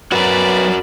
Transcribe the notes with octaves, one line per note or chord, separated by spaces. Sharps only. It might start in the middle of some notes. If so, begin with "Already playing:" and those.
F#3 F#4 A#4 B4 C#5 D5 B5